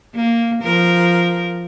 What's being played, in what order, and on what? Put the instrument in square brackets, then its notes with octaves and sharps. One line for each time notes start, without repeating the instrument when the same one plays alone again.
[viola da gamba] A#3
F3 A#4